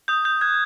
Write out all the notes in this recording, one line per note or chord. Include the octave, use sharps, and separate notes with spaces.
D#6 G6
D#6 G6
F#6 G#6